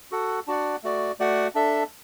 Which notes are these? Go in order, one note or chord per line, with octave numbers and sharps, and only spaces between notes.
F#4 A4 F#5
D4 F#4 D5 F#5
A3 F#4 D5
A3 F#4 D5 F#5
D4 A4 E5